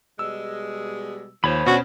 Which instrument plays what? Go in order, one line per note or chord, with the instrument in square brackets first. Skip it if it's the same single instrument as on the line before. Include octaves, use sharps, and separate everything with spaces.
[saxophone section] B2 G3 G#3 [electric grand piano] E6
[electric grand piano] D#2 [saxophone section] F3 [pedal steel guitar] C5 C#5 B5
[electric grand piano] B2 C#4 [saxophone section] D4 [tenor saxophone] F#4